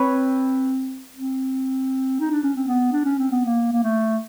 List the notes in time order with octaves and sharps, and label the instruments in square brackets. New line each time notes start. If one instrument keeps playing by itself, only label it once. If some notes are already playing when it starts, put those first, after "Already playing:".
Already playing: [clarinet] C4 [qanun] B4 C#5
[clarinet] C4
D#4
D4
C#4
C4
B3
D4
C#4
C4
B3
A#3
A#3
A3